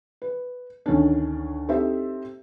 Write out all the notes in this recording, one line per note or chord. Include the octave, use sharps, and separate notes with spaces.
B4
D2 D#3 C#4 D4
C4 D#4 G4 A4 C5 E5